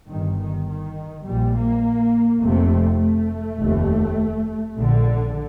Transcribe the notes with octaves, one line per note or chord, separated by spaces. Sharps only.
G1 G2 D#3
D#3
D#3
A#1 A#2 G3
A#3
F1 F2 C3 A3
A3
F1 D#2
A#1 A#2 D3